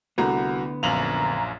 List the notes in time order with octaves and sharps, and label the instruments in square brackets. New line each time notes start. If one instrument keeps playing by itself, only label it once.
[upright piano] C2 F#4 A#5 [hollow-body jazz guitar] D3 A3 B3
[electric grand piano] A#1 F#2 F5 [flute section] A#5 [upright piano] F7 F#7